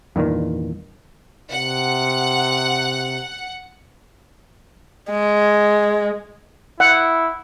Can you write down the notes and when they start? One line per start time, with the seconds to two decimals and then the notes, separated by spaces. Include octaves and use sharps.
0.16 E2 G2 A#2 D#3
1.51 C3 F#5
5.10 G#3
6.80 E4 F#5